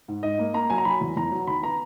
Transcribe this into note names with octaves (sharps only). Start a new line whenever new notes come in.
G#2
G#2 D#5
A#3
A#3 A#5
F#3 G#5
A#5
F#3 B5
E2
E2 A#5
F#3
D#3 B5
B3 A#5